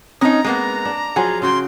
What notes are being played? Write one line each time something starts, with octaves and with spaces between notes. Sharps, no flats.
C4 C#4 D#4 A#5 D#6
G#3 A#3 B3
D4
F3 F#3 F4 G#4 F#5 G#5
C#3 F#4 G5 C6